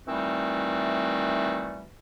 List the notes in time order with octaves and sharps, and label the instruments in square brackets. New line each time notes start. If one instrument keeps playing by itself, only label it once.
[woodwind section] D#3 E3 G3 A3 C4 F#4